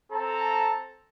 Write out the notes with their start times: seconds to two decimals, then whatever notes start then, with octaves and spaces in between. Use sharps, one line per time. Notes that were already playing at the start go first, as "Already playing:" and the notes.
0.12 C4 A4 A5 A#5